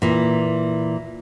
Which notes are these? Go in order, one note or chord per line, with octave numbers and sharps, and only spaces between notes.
A#2 E3